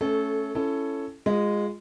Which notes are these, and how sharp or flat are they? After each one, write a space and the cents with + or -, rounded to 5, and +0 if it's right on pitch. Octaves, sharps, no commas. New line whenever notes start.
A3 +0 C#4 +0 A4 -20
C#4 +0 E4 +25 A4 +0
G#3 -10 F4 +25